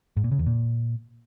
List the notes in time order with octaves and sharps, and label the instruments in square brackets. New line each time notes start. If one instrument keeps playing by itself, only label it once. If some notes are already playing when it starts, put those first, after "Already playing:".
[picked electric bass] G#2
A#2
C#3
E2
A#2